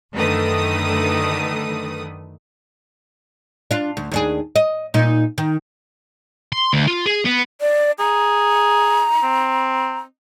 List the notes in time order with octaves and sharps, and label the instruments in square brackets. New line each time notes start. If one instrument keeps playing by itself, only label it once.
[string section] F#2 D3 D#3 A3 B4 D#6
[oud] D4 F4
D2
D#2 D4 G#4
D#5
A#2 D#4
D#3
[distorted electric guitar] C6
D2
F4
G#4
B3
[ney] D5
[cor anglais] G#4 [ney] A#5
[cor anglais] C4